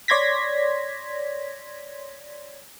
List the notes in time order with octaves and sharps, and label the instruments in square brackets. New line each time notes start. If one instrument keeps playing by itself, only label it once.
[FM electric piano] C#5 D5 C6 G#6 A#6 B6